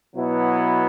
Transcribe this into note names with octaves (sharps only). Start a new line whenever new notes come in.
B2 F#3 B3 E4